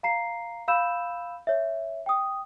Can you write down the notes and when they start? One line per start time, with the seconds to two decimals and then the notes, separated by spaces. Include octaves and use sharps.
0.03 F5 A#5 C7
0.68 F5 B5 E6 G6 E7
1.47 C#5 E5
2.06 G5 D#6